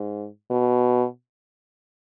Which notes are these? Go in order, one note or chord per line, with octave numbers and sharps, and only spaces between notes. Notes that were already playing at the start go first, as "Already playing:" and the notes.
Already playing: G#2
B2